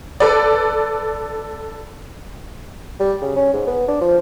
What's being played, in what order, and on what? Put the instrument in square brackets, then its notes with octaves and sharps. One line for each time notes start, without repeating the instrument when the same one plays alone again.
[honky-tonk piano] A4 B4 D5
[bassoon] G3
C#3
C#4
G#2
B3
D4
F3